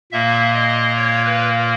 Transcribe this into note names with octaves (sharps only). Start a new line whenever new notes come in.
A#2 A#3 E5
D#5
C#5
B4